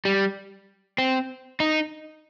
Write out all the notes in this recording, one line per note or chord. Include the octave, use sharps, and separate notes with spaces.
G3
C4
D#4